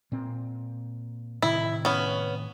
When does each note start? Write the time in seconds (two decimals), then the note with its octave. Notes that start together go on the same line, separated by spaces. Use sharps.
0.12 A#2 C4
1.42 A2 C3 D#3 E4
1.85 B3 C#4